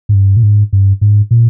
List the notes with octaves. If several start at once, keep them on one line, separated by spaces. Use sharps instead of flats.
G#2
G2
A#2
G#2
G2
G#2
A#2